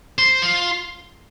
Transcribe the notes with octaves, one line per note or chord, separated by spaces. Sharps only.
C5
F4